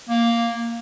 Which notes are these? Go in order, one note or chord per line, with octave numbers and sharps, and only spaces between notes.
A#3